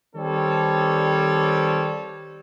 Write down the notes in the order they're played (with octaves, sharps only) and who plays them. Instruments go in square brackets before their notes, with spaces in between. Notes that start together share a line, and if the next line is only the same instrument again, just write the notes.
[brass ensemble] D#3 G3 C4 A4 C#5